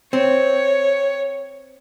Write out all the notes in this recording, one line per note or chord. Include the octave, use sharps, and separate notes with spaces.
C4 C#5